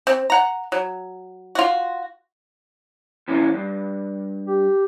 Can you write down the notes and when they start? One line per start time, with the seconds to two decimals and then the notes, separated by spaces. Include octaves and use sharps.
0.07 C4
0.30 F#5 A#5
0.72 F#3
1.55 F4 F#4
3.28 C3 E3 C#4
3.54 G2
4.47 G4